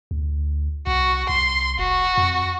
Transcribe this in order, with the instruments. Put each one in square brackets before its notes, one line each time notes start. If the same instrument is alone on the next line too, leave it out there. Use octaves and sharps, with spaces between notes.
[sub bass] D2
[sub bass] C2 [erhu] F#4
[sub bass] C2 [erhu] C6
[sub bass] F1 [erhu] F#4
[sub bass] F2